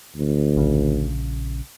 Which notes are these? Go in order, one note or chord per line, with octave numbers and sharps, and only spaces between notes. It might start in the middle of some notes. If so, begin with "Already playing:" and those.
D2
A#1 C#3